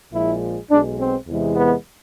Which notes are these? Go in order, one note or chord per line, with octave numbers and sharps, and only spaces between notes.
A#1 A#2 F3 G#3 E4
B1 B2 G#3 D4
C4
E2 C3 E3 G#3
B3